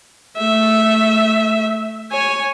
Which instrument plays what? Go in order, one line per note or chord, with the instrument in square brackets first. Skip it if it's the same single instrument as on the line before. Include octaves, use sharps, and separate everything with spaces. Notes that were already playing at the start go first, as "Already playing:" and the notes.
[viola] A3 E5
C#5 G#5